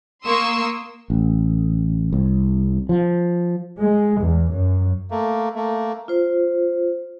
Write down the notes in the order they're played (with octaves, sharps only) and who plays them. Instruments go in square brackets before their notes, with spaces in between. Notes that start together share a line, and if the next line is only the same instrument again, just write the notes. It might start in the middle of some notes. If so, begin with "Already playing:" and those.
[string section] A#3 A#4 C6 C#6 D#6 E6
[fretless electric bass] A1
C2
F3
[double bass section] G#3
E2
F#2
[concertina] A3 A#3
A3 A#3
[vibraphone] F4 C5